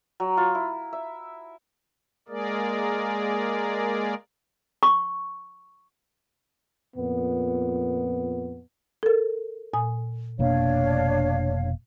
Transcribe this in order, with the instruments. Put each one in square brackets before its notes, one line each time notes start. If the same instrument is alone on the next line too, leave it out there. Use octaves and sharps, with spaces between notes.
[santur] F#3
F4
E4
E5
[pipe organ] G#3 A#3 G#4 A#4 D5
[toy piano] C#6
[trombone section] F2 A#2 B3
[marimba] A4 A#4
A#2 G#5 D#6
[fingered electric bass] F1 B2 A#3 [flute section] D4 C#5 F5